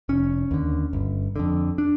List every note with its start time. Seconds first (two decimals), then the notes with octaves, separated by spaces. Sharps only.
0.09 F1 C#4
0.51 D#2 D3
0.93 G1
1.36 F2 D3
1.78 D4